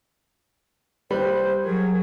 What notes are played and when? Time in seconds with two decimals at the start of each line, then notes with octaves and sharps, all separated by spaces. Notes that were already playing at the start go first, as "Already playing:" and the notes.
1.11 G3 B4 C5
1.64 F#3 G#4 A#4